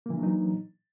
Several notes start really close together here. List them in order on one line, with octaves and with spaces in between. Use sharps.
A#3 E3 D4 F#3 D#4